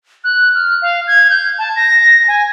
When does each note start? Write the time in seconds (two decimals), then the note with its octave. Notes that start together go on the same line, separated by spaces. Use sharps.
0.24 F#6
0.55 F6
0.82 F5
1.07 G#6
1.30 G6
1.58 A5
1.76 A#6
2.28 G#5